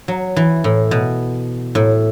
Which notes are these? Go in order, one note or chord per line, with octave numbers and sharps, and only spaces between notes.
F#3
E3
A2
B2
A2